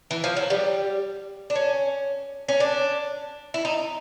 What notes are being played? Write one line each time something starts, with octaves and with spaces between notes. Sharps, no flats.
E3
F3
F#3
G3
D4
C#4
C#4
D4
E4
D#4